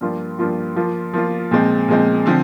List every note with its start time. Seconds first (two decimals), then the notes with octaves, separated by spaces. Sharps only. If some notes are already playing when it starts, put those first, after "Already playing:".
0.01 G2 F3 A#3 F4
0.39 G2 F3 A#3 F4
0.76 F3 A#3 F4
1.13 F3 A#3 F4
1.51 A#2 F3 G#3 C4
1.88 A#2 F3 G#3 C4
2.26 D3 F3 C4